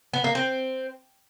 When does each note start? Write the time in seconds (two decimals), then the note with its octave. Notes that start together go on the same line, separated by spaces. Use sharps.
0.13 B3
0.24 A#3
0.35 C4